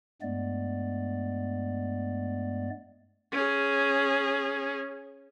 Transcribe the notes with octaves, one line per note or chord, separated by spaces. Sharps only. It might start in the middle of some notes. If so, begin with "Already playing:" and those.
G2 G#3 A3 B3 D5
C#4 G#4